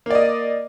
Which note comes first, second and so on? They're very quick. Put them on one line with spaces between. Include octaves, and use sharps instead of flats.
A#3 D5 D#5